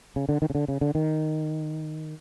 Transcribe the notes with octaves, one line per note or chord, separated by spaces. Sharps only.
C#3
D3
D#3
C#3
D3
C#3
D3
D#3